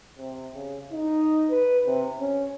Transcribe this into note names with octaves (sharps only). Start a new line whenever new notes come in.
C3
C#3
D#4
B4
C3
C#4